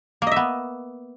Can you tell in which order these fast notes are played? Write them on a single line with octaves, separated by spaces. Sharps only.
A#3 D#5 E5 B3